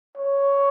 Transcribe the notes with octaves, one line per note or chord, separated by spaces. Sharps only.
C#5